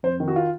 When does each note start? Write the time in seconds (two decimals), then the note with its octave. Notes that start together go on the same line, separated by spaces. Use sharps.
0.03 F2 C5
0.20 D#3
0.28 F#4
0.36 F4